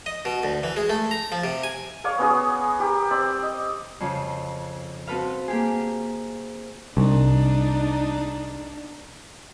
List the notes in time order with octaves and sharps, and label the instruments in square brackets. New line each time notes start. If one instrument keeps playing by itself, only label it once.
[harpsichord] D#5
B2
D2
E3
G#3
A3
A#5
F3
C3
G#5
[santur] C#5 D5 F5 C#6
B3 C#4 F#4 G#4
G4 A#4
C4 D5 B5
D#5
[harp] F2 C#3 F3
C4 F#4 A4 B4 F5
A#3 G4 G#4
[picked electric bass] C2 [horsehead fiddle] D4 D#4